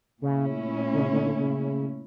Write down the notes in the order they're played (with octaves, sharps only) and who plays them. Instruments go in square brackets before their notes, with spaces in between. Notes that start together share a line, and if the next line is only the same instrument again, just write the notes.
[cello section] A#2 A3 C#4 E4 [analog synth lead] C#3
[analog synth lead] D3
C#3
D3
D3
C#3